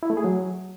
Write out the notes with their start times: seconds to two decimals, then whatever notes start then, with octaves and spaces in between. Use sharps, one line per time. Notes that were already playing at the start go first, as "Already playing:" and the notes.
0.03 E4
0.10 A3
0.17 G#4
0.24 F#3